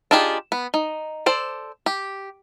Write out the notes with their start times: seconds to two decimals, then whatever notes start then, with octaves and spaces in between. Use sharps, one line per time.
0.11 D4 D#4 F4 G4 G#4
0.52 B3
0.74 D#4
1.26 A4 C5 D5
1.86 G4